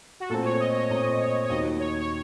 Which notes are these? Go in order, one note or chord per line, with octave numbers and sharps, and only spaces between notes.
F#4
A#2 A3 C4 A4
C#5
D#5
C#5
A#2 A3 C4 D#5
C#5
C#5
D#2 D#3 F#3 D#5
C#5
C#5